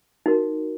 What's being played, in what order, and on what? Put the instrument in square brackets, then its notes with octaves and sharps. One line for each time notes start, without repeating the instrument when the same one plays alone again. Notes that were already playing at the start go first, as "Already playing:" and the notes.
[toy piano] D#4 F#4 A#4